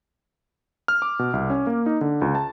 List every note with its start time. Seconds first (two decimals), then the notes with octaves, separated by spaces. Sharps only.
0.88 F6
1.02 D6
1.19 B2
1.33 C2
1.50 C#4
1.67 A#3
1.86 D#4
2.01 D3
2.22 C#2
2.35 A5